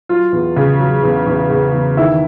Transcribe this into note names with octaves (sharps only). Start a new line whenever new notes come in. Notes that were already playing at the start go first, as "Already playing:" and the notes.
F#3 F4
E2
C#3
F#3
E2
E2
E2
E2
D#3 E4